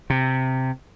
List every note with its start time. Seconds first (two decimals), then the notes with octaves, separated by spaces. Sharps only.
0.10 C3